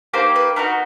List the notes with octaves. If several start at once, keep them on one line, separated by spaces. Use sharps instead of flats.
A#3 D#4 G4 C5
B4
B3 D#4 F#4 A#4